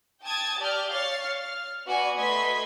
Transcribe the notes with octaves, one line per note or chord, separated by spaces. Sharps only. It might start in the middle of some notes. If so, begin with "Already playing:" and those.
G5 A5 D#6 G#6 A6
G4 D5 F6 G6
C#5 F5 F6 A6 C7
F6
B3 F#4 D5 G#5
A3 B4 D#5 C6 G#6 B6